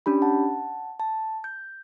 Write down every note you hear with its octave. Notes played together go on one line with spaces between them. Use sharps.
C#4 D4 G4 B5
F#5 A5
A5
G6